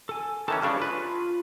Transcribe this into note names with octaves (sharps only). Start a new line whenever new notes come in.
A4 G#5
D#3 E3 C#4 A4 A5
G2 C#3 D4 G4 C#6 F6
F4 B4 B5